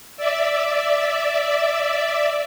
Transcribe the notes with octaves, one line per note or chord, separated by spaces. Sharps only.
D5 E5